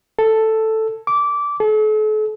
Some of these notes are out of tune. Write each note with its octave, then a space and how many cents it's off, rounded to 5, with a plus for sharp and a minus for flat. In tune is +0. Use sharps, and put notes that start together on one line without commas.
A4 +5
D6 -15
A4 -40